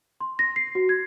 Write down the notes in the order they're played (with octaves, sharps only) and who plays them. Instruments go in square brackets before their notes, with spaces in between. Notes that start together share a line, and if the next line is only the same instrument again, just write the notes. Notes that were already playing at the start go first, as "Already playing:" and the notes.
[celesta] C6
A#6
C7
F#4
G#6